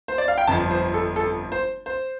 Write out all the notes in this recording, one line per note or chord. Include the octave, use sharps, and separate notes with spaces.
C5
D5
F5
G5
G1 F2 F3 A5
C5
A4
A4
C5
C5